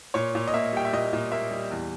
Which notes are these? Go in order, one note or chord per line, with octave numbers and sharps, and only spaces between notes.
A#2 C#5
A#2
D#5
A#3 E5
G3 G5
E5
A#2 D#5
A#2
A#3 E5
G3
E2